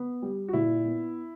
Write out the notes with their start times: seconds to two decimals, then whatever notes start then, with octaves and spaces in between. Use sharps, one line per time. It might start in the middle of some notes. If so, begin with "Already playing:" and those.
Already playing: B3
0.22 G3
0.48 F#4
0.53 A#2 E4
0.85 B3